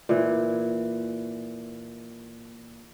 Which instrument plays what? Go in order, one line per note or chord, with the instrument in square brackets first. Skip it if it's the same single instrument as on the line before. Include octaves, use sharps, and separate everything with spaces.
[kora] A#2 E3